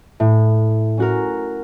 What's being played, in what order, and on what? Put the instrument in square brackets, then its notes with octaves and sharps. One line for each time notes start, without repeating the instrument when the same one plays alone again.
[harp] A2
C#4 F#4 A#4